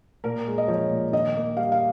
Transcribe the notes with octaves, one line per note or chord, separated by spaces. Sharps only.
A#2 A#4
G#3
D#5
F3 C#5
A#2
D#3 D#5
A#3
G3 F5
F5